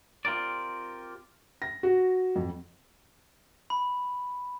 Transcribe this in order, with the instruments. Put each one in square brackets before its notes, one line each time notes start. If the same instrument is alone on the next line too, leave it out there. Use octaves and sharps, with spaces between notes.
[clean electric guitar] C4 F4 G4 A#4 D5
[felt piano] A#6
F#4
F2
[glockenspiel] B5